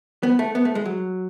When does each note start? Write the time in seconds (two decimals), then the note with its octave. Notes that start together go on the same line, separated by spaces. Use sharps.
0.23 B3
0.39 A3
0.55 B3
0.65 A3
0.75 G#3
0.86 F#3